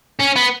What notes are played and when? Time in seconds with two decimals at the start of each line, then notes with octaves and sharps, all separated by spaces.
0.19 C#4
0.36 B3